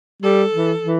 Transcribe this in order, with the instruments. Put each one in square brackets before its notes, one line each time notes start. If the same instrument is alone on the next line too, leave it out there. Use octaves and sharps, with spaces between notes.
[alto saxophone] G3 [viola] A4
[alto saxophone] E3
E3